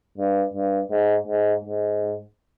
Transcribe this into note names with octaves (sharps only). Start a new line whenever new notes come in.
G2
G2
G#2
G#2
G#2